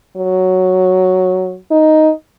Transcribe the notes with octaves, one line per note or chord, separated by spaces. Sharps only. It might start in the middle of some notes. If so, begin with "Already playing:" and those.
F#3
D#4